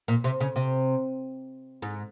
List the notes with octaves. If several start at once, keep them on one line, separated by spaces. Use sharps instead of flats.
A#2
C3
C#3
C3
G#2